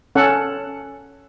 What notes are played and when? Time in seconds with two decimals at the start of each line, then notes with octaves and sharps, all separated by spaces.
0.15 C#4 A4 F#5